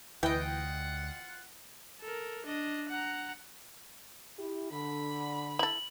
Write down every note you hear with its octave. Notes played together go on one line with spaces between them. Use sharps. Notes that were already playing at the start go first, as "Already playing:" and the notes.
D2 E3 F4 D#5 F#5 G5
A4 A#4
D4 D#5
F#5 A#5
E4 G4
D3 B5
E4 A4 F#7